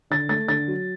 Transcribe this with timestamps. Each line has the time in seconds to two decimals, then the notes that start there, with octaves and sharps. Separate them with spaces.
0.10 D3 A6
0.29 A3 A6
0.48 D3 A6
0.68 F#3